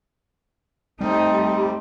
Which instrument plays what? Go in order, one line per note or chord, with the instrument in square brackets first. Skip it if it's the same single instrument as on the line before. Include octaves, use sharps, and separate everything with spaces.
[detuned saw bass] G3 [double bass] A3 C4 [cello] D#4